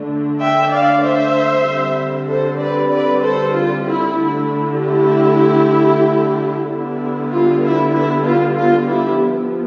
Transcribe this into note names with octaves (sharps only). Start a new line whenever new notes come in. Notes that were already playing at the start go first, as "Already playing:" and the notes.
Already playing: D3 A3 D4
E5 G5
D5 F5
C5 E5
D3 G3 C4
A4 C5
B4 D5
B4 D5
A4 C5
F4
E4
D3 A3 E4
E4 G4
D3 G3 B3 E4
F4
E4
E4
F4
F4
E4 G4
F3 B3 E4